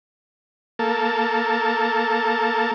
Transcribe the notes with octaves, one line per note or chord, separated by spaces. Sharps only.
A#3 A4